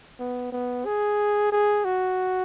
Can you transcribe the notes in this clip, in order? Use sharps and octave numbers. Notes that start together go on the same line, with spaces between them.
B3
B3
G#4
G#4
F#4